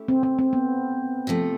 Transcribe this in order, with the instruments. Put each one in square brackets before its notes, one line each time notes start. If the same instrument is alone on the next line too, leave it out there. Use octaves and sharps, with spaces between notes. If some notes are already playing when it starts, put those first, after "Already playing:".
Already playing: [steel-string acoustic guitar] A3 C#4 E4 G4
[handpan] C4
C4
C4
B3
[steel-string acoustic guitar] C3 F3 A3